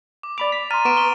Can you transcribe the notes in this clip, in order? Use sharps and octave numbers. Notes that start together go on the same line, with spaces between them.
D6
D5 B5 D6 F7
B6
A#5 C6 F6 A6 D#7
B3 C#6 D7 E7
G7